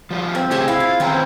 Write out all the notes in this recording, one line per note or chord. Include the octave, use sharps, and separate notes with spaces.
F3 G3 F4
C4
A2 C#3 G4 G#4 D#5 E5
E4 F5
F4
D#3 C4 C#4 E4 A#5